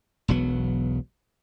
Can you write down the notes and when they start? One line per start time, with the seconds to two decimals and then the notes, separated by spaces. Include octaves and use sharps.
0.28 E1 B1 F#3 B3